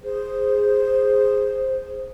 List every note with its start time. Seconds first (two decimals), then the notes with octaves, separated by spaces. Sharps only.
0.02 G#4 C5